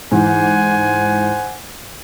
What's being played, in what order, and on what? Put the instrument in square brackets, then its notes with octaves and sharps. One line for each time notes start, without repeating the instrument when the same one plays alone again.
[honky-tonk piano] G#2 E3 [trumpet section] C5 F#5 G#5